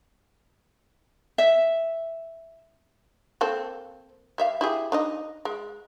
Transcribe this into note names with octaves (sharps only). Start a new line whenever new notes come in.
E5
A#3 C4 A4
G3 E5 F5
E4 G4 G#4
D4 D#4 D#5
G#3